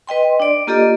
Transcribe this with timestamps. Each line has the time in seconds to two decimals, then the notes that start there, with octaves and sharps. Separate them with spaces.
0.07 B4 D#5 G5 C6
0.40 D4 D5
0.67 A#3 F4 G4 A4 D5 D#5